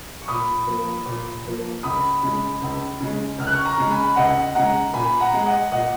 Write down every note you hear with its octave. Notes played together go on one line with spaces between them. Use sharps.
C#6
A#2 B5 D#6
F3 A#3
A#2
F3 A#3
C#2 B5 D#6
C#3 G#3
C#2
C#3 G#3
C#2 F6
F#6
C#6 F6
A#5 C#6
C#3 G#3
G#5 B5
C#2 D#5 F#5
C#3 G#3 F#5 A#5
A#2 G#5 B5
F#5 A#5
G#3
D#5 F#5
A#2 D#5 F#5